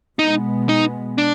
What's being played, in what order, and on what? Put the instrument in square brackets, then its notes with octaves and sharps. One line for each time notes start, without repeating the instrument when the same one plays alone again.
[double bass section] B2 G#3 B3 [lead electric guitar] D#4
[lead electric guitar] D#4
D4